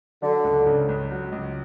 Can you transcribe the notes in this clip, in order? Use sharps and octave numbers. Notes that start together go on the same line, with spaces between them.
D3 F#3
C#2
C#3
C#2
F#3
C#2